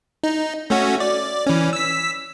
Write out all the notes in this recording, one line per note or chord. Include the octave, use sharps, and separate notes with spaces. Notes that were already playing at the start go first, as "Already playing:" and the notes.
D#4
A3 C#4 F#4
D5
E3 C#4
E6 B6